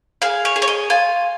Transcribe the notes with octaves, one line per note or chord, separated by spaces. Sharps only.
G#4 F5
C#5
G#4
C#5
D#5
F4 G#5